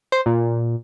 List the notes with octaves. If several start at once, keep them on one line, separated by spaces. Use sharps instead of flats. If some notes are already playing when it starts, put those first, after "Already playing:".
C5
A#2